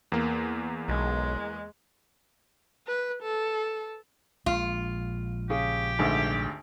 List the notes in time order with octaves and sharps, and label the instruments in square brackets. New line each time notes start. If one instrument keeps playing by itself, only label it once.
[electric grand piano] E2 A#3
[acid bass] B1 [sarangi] G#3
[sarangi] B4
A4
[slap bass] A#1 G#3 [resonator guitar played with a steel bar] F4
[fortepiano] C#3 [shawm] G4
[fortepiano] G#1 D2